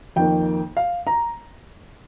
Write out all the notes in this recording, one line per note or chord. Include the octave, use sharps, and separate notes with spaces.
F2 D#3 A#3 G5
F5
A#5